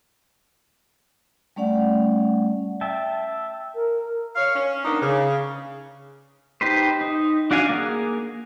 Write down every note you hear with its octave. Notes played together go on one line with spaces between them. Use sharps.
G3 A3 C#4 D5 F#5
E5 G5 A5
A#4
C#5 F5
C#4
A#3 B3 D4 D#4
C#3
D#4 G4 B4 C5
D#4
D4 F#4 D5 F5 G#5
A#3 G#4